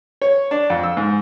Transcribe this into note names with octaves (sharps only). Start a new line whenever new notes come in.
C#5
D4
F2
E6
G#2